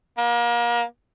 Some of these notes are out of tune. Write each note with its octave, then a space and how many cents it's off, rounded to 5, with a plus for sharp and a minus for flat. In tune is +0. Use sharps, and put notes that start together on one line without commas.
A#3 +35